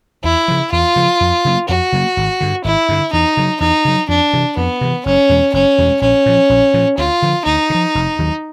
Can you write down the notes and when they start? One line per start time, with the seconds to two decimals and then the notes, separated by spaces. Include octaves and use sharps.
0.23 E2 E4
0.48 C#3 F3
0.72 E2 F4
0.96 C#3 F3
1.21 F2
1.45 C#3 F#3 A#3
1.68 F2 F#4
1.92 C#3 F#3 A#3
2.17 G#1
2.41 G2 D3
2.64 G#1 E4
2.89 G2 D3
3.13 E2 D#4
3.37 C#3 F#3
3.60 E2 D#4
3.85 C#3 F#3
4.09 F2 D4
4.33 C3 E3
4.57 F2 B3
4.81 C3 E3
5.06 F#1 C#4
5.29 E2 B2 G#3
5.53 F#1 C#4
5.78 E2 B2 G#3
6.01 A#1 C#4
6.26 A#2 F3
6.49 A#1
6.74 A#2 F3
6.97 D2 F4
7.22 D3 F3
7.46 D2 D#4
7.70 D3
7.75 F3
7.95 F1
8.19 D#2 D#3 F#3